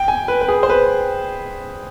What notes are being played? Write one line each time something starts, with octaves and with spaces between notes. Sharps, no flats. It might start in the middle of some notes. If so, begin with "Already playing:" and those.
Already playing: G5
G#5
B4
B4
G#4
C5
B4